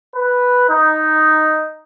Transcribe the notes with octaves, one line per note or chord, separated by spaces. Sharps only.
B4
D#4